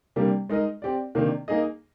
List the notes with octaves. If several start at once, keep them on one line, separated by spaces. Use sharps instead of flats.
C3 G3 A#3 D4 G4
G#3 D#4 A#4 D#5
C4 G4 D5
C3 D#3 A#3 D4
A#3 D#4 G#4 D#5